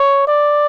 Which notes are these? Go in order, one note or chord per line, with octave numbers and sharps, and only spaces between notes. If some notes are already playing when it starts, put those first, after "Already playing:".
Already playing: C#5
D5